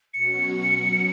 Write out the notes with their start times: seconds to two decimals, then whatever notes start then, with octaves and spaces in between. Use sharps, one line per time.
0.14 B2 F#3 C#4 F#4 C#7